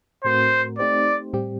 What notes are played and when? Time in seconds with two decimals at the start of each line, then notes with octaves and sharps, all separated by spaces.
0.24 A2 A3 C4 F#4 A#4 C5
0.79 A3 C4 D#4 G4 C5 D5
1.33 A2 G3 C4 G4